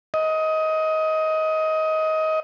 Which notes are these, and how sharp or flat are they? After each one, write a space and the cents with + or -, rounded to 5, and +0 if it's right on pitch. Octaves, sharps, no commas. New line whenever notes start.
D#5 +20